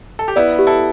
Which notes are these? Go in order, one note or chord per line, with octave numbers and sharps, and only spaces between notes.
A4
G4
B3 E4 D5
G4
E4 A4